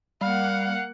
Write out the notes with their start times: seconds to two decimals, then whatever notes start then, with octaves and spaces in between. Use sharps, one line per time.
0.21 G3 A#3 F5 F#5